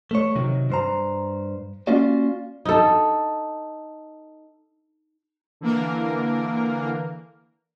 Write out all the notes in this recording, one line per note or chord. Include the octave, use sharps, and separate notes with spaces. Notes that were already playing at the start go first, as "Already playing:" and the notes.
A3 C#5
C3 D#3 F#3
G2 C5 A#5
A#3 C#4 F4 F#4 D5
D#4 A4
D3 E3 A#3 A#4